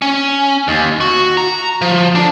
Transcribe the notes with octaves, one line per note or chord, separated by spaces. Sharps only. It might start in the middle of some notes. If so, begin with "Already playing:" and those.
C#4
D#2
F#4
A#5
F3
D3 D4